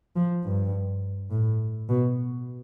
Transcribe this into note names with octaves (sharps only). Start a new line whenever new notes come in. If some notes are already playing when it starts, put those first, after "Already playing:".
F3
G2
A2
B2